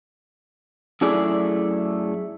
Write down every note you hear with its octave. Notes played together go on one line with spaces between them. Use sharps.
F#2 A3 E4 G#4 D5